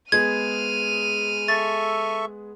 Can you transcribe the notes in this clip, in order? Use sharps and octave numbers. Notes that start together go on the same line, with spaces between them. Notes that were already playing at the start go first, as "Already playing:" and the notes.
G#3 B3 G#4 F6 G#6 D#7
A4 E5 C#6 A6